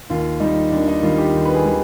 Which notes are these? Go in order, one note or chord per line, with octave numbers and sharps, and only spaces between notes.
D#2 F4
D#3 G3 D#4
D#2 D4
D#4
D#3 G3 F4
G4
D#2
B4
G#4
D#3 G3